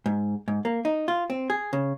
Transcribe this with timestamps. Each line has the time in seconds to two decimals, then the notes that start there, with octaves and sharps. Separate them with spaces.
0.06 G#2
0.48 G#2
0.65 A#3
0.85 D#4
1.08 F4
1.30 C4
1.50 G#4
1.73 C#3